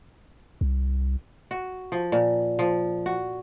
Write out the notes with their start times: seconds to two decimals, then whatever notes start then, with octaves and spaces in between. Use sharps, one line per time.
0.61 C2
1.51 F#4
1.92 F3
2.12 A#2
2.59 F3
3.06 F#4